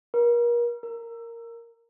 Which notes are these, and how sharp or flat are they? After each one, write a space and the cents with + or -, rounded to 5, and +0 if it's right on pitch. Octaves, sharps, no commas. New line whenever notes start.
A#4 +35
A#4 -10